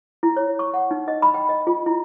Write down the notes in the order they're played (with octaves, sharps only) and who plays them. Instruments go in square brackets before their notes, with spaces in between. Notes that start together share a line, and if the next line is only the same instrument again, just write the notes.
[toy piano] E4
C#5
C#6
F#5
D#4
D#5
B5
G5
D#5
F4
E4